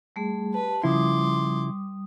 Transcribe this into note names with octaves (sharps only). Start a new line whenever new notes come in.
G3 A3 G#4
G4 B4 A5
C#3 F3 G3 E4 C6 D6 D#6